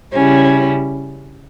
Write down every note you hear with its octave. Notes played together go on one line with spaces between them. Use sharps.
C#3 G3 C#4 E4